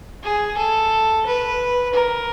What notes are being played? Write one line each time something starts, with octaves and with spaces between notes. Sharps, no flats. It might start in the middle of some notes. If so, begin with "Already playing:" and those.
G#4
A4
B4
A#4